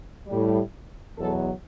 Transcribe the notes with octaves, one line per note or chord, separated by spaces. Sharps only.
A2 G3
E2 B2 F#3 A4